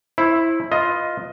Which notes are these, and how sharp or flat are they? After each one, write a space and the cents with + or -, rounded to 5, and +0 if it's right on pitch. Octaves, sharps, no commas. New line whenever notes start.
E4 +0 C5 +30
F4 +0 B4 +0 D#5 +15